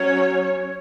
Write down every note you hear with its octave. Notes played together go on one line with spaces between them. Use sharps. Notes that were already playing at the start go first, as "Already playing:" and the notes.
Already playing: F#3 C#4 C#5